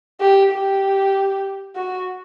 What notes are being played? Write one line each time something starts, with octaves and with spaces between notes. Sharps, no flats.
G4
G4
F#4